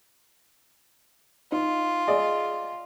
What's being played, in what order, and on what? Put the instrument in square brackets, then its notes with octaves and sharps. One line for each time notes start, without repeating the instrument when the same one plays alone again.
[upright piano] D#4 [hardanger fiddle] F4
[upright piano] G#4 D5 D#5